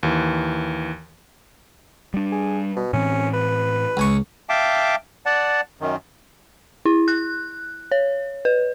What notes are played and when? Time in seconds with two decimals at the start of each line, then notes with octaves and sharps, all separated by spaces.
0.03 D#2 E3
2.14 G3 D4
2.32 G#4
2.77 B2
2.93 A2 E3 C4 C#4
3.34 B4
3.97 C#2 G#5 C#6
4.49 E5 F5 G5 A5 D6
5.26 D5 F#5 A5
5.81 F#2 D#3
6.85 E4
7.08 F#6
7.92 C#5
8.45 B4